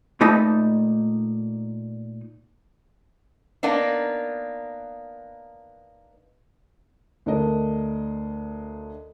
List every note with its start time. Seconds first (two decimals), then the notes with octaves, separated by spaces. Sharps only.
0.21 A#2 A3 D#4 B4 D#5 A5
3.63 A#3 B3 D4 D#4
7.26 D2 D4 A#4 D#5